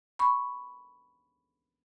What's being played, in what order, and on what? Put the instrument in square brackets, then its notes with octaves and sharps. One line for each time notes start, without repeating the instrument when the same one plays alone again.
[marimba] B5 C#6